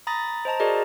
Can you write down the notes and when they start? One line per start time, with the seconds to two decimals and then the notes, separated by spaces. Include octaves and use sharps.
0.07 A#5 B5 D#6 A6 A#6
0.45 C5 D#5 A5 A#5
0.60 F#4 G#4 A#4 D5 D#5